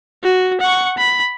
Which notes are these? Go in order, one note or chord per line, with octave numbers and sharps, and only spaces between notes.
F#4
F#5 C#6
B5